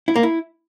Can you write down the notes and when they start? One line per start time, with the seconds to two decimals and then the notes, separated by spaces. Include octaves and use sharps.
0.08 E4
0.16 A#3
0.23 E4